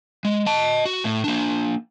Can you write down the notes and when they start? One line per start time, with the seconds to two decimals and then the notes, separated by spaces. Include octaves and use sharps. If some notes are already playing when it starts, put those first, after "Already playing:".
0.25 G#3
0.46 D#5 A5
0.85 F#4
1.04 A2
1.24 A#3 D4